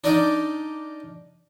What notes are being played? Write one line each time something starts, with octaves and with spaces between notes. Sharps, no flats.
D4 D#4 D5 D#5 F5 G5